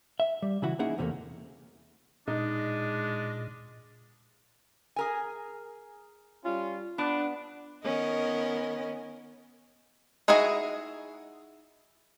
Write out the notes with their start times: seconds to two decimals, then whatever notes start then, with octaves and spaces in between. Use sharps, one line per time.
0.20 E5
0.42 G3
0.62 C#3 E3 E4 F#4
0.79 A#3 C#4 D#4 E4 G#4 F#5
0.98 E2 C3 F#3 G3 A3 A#3
2.28 A#2 G#3 D4 D#4
4.96 G#4 A#4 G#5
6.44 G3 C#4 F4
6.98 B3 D4
7.83 D#3 B3 C#4 A#4 D#5
10.28 D#4 E4 F#4 G#4 D#5